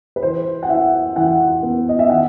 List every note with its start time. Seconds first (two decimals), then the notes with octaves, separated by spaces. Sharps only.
0.16 B4
0.22 E3 C5
0.63 F#5
0.68 E4 E5
1.16 E3 F#5
1.63 B3
1.89 D#5
1.99 E5
2.09 D#3 F#5